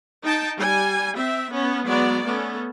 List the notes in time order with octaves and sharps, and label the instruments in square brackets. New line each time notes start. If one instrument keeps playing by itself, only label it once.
[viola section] D#4 G5 A5
G3 G#5
C4 E5
B3 C#4
F#3 G#3 B3 F#4 D5
A3 B3 C#4 A4